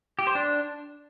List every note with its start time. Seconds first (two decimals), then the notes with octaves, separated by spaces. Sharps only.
0.19 G4
0.27 C5
0.35 D4